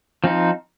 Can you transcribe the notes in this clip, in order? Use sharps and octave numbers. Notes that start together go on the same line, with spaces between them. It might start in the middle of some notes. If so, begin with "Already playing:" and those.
F3 C4 D#4